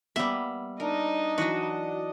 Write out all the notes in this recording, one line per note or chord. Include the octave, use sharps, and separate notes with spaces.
G3 A#3 B3 E5
D4 D#4 A#4 D#5
E3 F#3 F#4